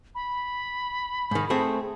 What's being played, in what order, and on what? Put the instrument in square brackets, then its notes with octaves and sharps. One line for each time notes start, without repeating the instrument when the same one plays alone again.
[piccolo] B5
[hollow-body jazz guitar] G#2 D#3
A3 C4 G#4